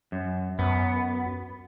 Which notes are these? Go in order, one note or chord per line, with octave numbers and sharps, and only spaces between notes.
F#2
F#2 B3